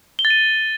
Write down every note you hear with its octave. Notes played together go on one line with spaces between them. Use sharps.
G7
A6
D#7